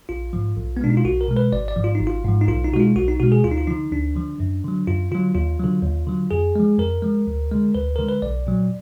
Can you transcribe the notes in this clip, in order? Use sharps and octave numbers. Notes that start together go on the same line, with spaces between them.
A#1 F4
G#2 F3
B1
B3
B2 G#3 D4
D#4
F4
B1 F#4
A#4
B2 G#3
B4
G#1 D5
D5
G#2 F3
F4
D#4
G#1
F4
G#2 F3
D#4
B1 F4
D#4
B2 G#3 F4 F#4
B1 F#4
D#4
B2 G#3 F#4
G#4
D2 F4
D#4
F4
D3 F3 D#4
D2 D4
D3 F3
F#2
D3 F#3
F#2 F4
D3 F#3 F4
D#2 F4
D3 F#3
D#2
D3 F#3
F2 G#4
F3 G#3
F2 A#4
F3 G#3
D2
D3 G#3
D2 B4
D3 G#3 A#4
B4
B1 D5
A#2 F#3